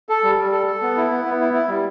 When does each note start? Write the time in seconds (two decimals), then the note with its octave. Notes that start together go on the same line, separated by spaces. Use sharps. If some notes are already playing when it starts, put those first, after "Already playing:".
0.09 A4
0.24 G3
0.38 G3
0.52 A4
0.67 A4
0.82 B3
0.97 E4
1.11 B3
1.25 B3
1.40 E4
1.54 E4
1.68 G3